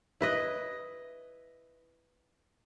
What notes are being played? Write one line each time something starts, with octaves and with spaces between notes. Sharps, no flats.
E4 B4 D#5